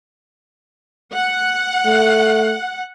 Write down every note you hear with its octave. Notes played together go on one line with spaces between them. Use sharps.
F#5
A3